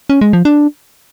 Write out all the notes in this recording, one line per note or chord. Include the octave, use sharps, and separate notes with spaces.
C#4
G#3
F3
D4